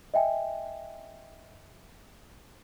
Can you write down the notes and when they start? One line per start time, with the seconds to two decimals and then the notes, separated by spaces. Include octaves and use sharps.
0.14 D#5 E5 G5 G#5